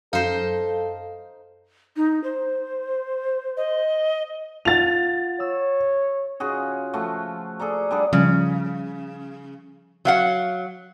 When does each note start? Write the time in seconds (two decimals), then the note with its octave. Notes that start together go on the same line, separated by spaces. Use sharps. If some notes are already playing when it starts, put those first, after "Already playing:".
0.13 F#2 D#4 A4 C5 F5
1.96 D#4
2.24 C5
3.57 D#5
4.65 F4 F5 F#5 A6 F7
5.40 C#5 E6
6.40 C#3 F4 F#4 G#4
6.93 F3 A3 F4 F#4
7.60 G#4 A4 D5 A#5
7.91 G3 D4 G#4 F#5
8.13 C#3 F3 G3
10.05 F#3 F5 F#5